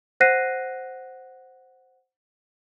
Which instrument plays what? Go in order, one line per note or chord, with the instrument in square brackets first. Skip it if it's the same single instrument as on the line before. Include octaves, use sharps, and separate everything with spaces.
[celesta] C5 F#5 F#6 A#6 C7 D#7